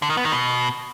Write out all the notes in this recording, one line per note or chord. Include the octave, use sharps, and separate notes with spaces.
D3
D#3
B3
D#3
B2